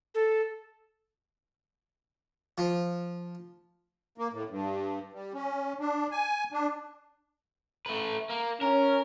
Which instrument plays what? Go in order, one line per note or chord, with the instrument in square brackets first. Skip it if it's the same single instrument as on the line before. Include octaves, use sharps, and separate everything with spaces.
[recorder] A4
[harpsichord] F3
[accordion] A#3
A2
G2
G3
C#4
D4
G#5
D4
[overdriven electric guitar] A3 B4
A#3
[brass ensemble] C#4 [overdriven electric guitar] A#4